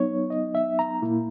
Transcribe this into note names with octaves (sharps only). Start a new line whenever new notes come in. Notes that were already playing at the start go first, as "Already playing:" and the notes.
Already playing: F#3 B3 D#4 C#5
D#5
E5
A#5
A#2 A#3 E4